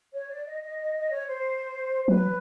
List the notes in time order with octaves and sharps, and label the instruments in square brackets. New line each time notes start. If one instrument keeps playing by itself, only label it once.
[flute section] C#5
D5
D#5
D#5
D#5
D#5
C#5
C5
[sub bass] F#3 [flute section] B4